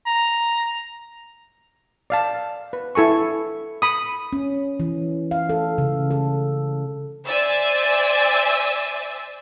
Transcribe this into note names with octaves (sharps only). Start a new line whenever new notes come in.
A#5
D5 F5 A5
B4
E4 A4 G#5 C#6
B5 D#6
C#4
E3
F5
A4
C#3
A4
C5 D5 E5 G#5 E6 A6